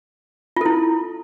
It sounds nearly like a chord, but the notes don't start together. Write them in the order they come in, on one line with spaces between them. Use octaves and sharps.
F4 A4 E4